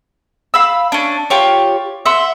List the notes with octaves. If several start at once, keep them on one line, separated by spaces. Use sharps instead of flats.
F5 B5 E6
C#4 D4
F4 G4 C#5
E5 F#5 C6